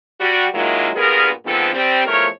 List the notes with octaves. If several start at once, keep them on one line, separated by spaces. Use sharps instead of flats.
G3 F#4
D#3 F#3 G#3 A#3 E4 F4
G2 A#2 B3 G#4 A#4
G#2 D3 F3 B3 C4 A4
G3 C4
E2 F3 A3 A#4 C#5